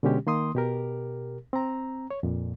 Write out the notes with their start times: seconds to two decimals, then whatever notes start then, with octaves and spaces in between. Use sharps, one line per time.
0.03 B2 D3 G#3 C#4 G4
0.27 D#3 A#3 C6 D#6
0.55 B2 G4 A#4
1.53 C4 A#5
2.11 C#5
2.23 F2 A#2